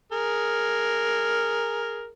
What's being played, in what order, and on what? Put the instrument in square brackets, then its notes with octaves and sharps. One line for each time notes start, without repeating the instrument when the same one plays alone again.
[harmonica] G#4 A#4